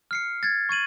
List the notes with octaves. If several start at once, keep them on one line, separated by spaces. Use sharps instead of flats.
F6 C7 C#7
G#6 A6
C#6 G#6 D#7 F#7